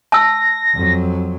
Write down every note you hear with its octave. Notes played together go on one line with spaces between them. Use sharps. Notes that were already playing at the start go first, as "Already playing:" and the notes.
A5 E6 A#6
F2 F#3